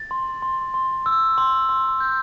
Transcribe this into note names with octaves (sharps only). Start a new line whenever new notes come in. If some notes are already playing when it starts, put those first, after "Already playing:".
Already playing: A6
C6
C6
C6
E6
C6
C6
G6